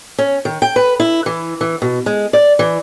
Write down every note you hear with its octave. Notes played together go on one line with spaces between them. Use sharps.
C#4
D#3
G5
B4
E4
E3
E3
B2
G#3
D5
E3